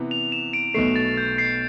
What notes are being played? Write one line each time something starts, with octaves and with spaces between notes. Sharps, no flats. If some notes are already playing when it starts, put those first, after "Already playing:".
Already playing: C3 E3 B3
F7
E7
D7
B1 B2 A3 C7
A6
G6
C7